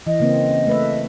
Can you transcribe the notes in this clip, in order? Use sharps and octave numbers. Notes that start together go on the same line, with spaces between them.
E3 D#5
C#3 A#3 C4
A3 B4 E5